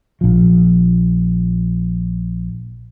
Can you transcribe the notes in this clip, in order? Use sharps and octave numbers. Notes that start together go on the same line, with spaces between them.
A#1 F3